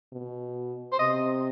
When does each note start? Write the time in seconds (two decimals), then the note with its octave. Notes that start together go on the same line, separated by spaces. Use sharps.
0.13 B2
0.92 C5
0.99 C3 D#5